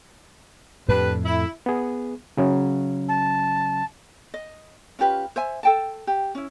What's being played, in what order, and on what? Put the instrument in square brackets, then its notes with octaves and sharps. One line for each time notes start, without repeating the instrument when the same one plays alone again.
[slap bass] F2 A2 [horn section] D4 G4 B4
[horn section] E4
[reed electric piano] B3 G#4
C#3 F#3 C#4
[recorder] A5
[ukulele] D#5
C#4 F4 G4 B4
C5 E5 G#5
A4 G5 A5
G4
C#4 E4